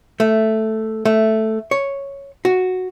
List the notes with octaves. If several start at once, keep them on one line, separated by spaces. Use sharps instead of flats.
A3
A3
C#5
F#4